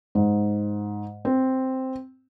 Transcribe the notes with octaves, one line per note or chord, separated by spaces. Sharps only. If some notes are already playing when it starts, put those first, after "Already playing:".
G#2
C4